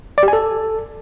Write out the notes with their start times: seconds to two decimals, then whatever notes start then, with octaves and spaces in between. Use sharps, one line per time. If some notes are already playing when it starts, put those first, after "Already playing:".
0.18 D5
0.23 G4
0.28 G#5
0.33 A4